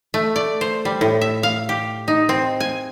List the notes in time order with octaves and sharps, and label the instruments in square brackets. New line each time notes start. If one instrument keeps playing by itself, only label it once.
[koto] A3
D5
C5
G3
A2
E5
F5
G4
D#4
C4
G#5